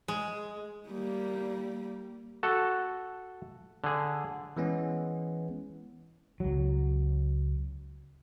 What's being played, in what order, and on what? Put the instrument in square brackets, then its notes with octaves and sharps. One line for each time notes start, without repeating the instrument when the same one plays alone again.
[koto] G#3
[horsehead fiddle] G3 A#3
[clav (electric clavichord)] F#4 A4
D3 G#4
[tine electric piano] E3 G#3 B3 C#4
[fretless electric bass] C#2 F#3